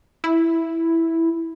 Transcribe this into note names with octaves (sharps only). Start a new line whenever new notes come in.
E4